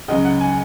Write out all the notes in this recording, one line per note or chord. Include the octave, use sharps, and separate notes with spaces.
C#2 C#3 F#3 D#5
F#5
G#5